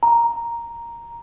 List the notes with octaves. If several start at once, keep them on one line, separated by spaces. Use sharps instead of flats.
A#5